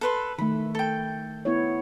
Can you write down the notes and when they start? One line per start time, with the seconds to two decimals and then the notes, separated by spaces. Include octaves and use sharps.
0.01 A4 B4 C6
0.38 D#3 A3 B5
0.75 A4 G5
1.45 B3 E4 C#5